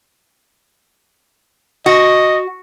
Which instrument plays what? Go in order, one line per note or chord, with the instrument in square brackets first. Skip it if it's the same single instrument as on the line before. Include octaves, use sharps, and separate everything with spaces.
[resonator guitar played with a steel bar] F#4 [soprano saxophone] D#5